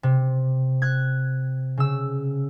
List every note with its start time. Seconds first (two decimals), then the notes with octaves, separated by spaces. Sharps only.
0.03 C3
0.82 F#6 G#6
1.77 C#3 E6